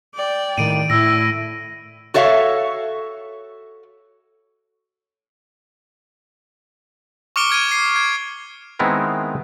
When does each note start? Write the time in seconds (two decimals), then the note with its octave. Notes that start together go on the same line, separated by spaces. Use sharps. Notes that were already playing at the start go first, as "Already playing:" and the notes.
0.15 D5 G5
0.58 A2 D#3 D7 D#7
0.90 A2 E4 E6 A#6
2.14 F#4 A4 C#5 E5 F5
7.36 C#6 D6 F6 C#7 D7 G7
7.50 F6 G#6 D7 D#7
7.72 C7
7.96 G#6
8.79 D#3 G#3 B3 C4 E4 A#4